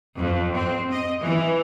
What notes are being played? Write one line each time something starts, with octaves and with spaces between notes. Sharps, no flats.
F2
C4
D#5
E3